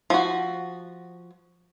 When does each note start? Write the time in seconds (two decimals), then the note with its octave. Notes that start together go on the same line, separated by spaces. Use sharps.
0.10 F3 F#4